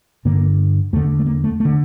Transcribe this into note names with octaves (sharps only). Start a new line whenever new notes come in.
G2 D3 A#3
E2 D3 A3
A3
A#3
A3
A3
D3